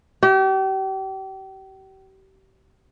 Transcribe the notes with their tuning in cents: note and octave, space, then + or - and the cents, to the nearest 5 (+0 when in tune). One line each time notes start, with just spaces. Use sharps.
G4 -35